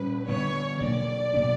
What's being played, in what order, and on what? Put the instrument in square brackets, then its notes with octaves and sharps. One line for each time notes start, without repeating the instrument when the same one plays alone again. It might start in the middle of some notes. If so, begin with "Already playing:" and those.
Already playing: [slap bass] A#2 G3 C#4 [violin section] B4
[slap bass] D3 G3 B3 D4 [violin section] C#5
[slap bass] B2 F#3 A#3 [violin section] D5
[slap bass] B2 F#3 B3 D4